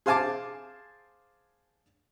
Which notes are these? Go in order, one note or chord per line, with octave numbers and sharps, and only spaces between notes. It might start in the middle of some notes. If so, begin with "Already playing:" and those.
G#4 C5 F5 G#5 A5 D6